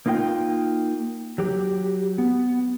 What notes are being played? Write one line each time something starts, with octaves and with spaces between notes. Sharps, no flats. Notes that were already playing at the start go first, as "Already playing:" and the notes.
A#3 D#4 F4 C5 G5
F#3 G4
B3